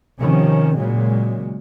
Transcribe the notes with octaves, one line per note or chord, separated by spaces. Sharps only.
C3 D#3 F3 C#4
A#2 C#3 F#3 G#3